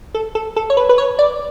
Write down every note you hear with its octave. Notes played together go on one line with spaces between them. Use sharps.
A4
A4
A4
C#5
B4
B4
C#5
D5